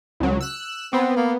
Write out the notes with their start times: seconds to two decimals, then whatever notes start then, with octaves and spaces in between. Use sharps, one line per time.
0.20 C#2 F#3
0.41 E6 F#6
0.93 B3 C4
1.16 A#3